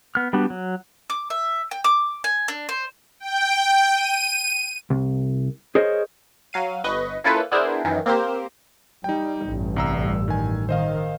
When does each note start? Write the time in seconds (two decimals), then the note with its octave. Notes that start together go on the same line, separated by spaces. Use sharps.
0.15 B3 F6
0.33 G3 B3 D4 F#4
0.50 F#3
1.10 D6
1.30 E5
1.71 G5
1.84 D6
2.24 G#5
2.48 D4
2.69 C5
3.20 G5
3.95 D#7
4.90 C2
5.75 G#4 A#4 C5 C#5 D#5
6.53 F#3 F5 D#7
6.84 G1 B4 D#5 C#6
7.24 A#3 C#4 E4 F4 A4 B4
7.52 B3 D4 E4 G#4 A#4 C5
7.84 F#2 D#3 E3
8.06 A#3 C4 G4 A#4 C5
9.04 G3 D#4 G5
9.47 A1 G2
9.76 C2 A#5 E6
10.28 D#3 G#5
10.69 D#3 C5 D#5 F5